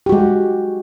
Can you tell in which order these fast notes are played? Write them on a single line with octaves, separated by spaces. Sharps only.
G4 F#4 G#3